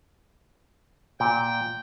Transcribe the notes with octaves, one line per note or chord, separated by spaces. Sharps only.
A#2 G5